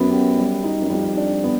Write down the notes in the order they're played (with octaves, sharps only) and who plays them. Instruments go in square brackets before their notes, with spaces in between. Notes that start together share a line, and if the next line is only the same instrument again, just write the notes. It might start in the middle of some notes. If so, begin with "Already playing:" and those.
Already playing: [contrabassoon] F#2 [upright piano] B3
[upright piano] G4
G3
D#4
[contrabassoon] F#2
[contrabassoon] F2 [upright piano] G3
[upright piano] D4
B3